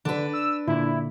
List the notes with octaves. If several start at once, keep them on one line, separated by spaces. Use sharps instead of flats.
D3 D4 B4
E6
A#2 D3 E4